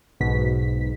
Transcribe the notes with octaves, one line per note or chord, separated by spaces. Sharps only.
B1 G#2 B2 B6